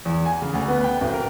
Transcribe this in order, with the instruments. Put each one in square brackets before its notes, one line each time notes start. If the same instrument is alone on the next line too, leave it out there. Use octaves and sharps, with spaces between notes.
[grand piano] E2
G#5
C#3
D2
B3
G5
D1
A#4